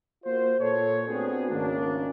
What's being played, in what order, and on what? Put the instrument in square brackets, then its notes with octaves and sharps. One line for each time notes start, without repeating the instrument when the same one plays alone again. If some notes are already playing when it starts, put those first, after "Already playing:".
[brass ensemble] A#3 F4 F#4 C5
A#2 A4 C#5
A3 B3 C4 D4 F#4 G#4
G#1 C#2 D#3 A#3 C#4 D4